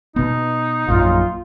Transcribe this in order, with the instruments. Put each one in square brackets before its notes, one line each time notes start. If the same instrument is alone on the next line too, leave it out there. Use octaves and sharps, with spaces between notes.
[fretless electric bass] B2 B3 [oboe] D#4
[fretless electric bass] A#1 F#2 A#2 [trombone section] F4